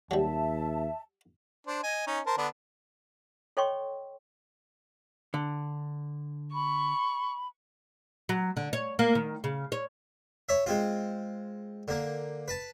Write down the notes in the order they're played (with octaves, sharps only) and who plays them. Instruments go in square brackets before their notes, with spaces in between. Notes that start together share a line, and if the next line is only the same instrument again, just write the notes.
[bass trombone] D#2 [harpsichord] F#3 G3 [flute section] E5 A5
[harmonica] D4 C5
D#5 G#5
C#4 D#4
A#4 C5 A5
D3 B3 D4
[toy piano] A4 C#5 D#5 G5 C6 C#6
[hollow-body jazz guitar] D3
[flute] B5 [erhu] C#6
[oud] F#3
D3
C#5
A#3
D#3
C#3
C#5
[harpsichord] C#5 E5
G#3 C4 F4
D3 A#3
B4 A5